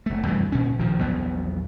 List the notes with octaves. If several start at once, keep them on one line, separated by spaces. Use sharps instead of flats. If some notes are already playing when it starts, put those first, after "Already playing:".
F#1 A3
E2 G2 C3 E3
A#2 C#4
A#1 A#2 D#3 F3
A#1 E2 F#3 B3